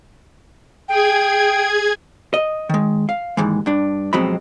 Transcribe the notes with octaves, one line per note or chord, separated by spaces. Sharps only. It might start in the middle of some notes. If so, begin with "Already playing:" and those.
G#4 G5 G#6
D#5
D#3 G#3
F5
D#2 G#2 E3 G#3
G2 D4
F2 B2 F#3 G#3 C4 B5